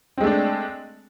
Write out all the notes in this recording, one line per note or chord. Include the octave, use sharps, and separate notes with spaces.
G#3 A3 C4 D4